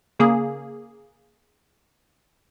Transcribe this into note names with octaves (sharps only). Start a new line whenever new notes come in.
C#3 A#3 G#4